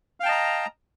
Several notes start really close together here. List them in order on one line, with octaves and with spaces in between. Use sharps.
F5 G5 A5 D#5 A#5